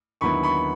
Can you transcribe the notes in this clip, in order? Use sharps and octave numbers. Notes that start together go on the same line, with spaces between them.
D#2 D3 F#3 B3 E4 B5 C#6
B5 C#6